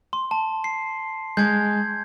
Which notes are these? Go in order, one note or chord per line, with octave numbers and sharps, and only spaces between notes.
C6
A5
C7
G#3 G6 G#6